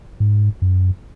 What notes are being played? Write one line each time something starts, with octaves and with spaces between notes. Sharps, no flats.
G#2
F#2